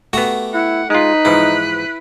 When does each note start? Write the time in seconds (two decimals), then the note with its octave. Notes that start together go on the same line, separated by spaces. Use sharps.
0.13 A3 B3 F#4 G4 A#5
0.54 E4 F#5
0.90 G#3 D#4 F4 B4
1.25 G#2 E3 F3 E4